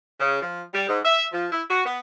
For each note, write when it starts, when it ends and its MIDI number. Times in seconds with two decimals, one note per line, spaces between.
0.20 0.40 49
0.42 0.61 53
0.72 0.88 55
0.89 0.99 44
1.04 1.26 76
1.32 1.45 53
1.51 1.62 64
1.69 1.82 66
1.83 1.98 59